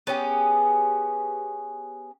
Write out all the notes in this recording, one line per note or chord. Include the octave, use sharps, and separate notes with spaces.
B3 C#4 G4 G#4